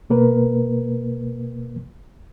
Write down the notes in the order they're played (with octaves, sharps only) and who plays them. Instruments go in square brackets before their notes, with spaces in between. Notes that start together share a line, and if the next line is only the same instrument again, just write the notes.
[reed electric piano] B2 A#3 A#4 B4